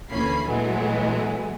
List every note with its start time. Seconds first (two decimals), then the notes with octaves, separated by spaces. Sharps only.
0.10 D2 E3 A#3 C#4 B5 C7
0.46 A#2 E3 F#3 G#3 A3 B3